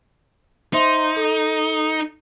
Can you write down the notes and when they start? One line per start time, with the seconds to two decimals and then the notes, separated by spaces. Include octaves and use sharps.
0.73 D#4 C5 E5 C6
1.16 A4